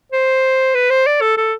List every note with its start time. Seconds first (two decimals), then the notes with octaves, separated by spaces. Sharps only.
0.12 C5
0.75 B4
0.90 C5
1.06 D5
1.21 A4
1.37 A4